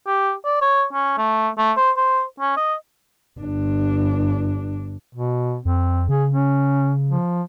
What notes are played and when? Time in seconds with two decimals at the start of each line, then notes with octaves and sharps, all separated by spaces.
0.07 G4
0.45 D5
0.61 C#5
0.93 C#4
1.18 A3
1.58 A3
1.77 C5
1.97 C5
2.40 C#4
2.57 D#5
3.39 G1 D4
5.15 B2
5.65 F2 C4
6.09 C#3 G#4
6.33 C#4
7.09 F3